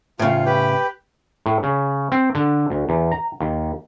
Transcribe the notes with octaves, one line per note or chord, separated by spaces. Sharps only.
A2 C#3 F4
G4 B4 G5
A2
C#3
C4
D3
D2
E2
A#5
D#2